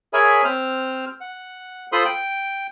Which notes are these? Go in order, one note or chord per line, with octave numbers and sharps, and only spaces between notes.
G#4 A#4 C#5 E5 G#5 B5
C4 C5 F6
F#5
F4 A4 C5 B5 C6 D#6
G5